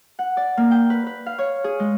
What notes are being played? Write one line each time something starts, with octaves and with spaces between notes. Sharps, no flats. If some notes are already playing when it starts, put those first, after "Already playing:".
F#5
D5
A#3
G5
B4
B4
F5
C#5
G#4
G#3